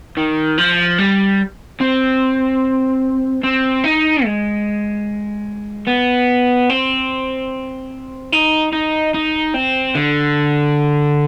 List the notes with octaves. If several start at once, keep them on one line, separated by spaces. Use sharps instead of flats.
D#3
F3
G3
C4
C4
D#4
G#3
B3
C4
D#4
D#4
D#4
C4
D3